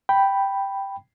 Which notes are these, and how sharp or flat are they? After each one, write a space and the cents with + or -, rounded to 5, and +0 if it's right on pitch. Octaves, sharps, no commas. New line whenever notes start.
G5 +0 B5 +0